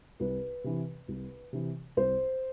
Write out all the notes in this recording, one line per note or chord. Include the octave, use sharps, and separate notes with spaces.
C2 B4
C3 E3
C2
C3 E3
C2 C5